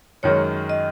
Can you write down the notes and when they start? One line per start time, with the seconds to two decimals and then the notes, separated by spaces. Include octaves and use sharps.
0.23 F#2 D#3 G#3 C#5
0.69 D#5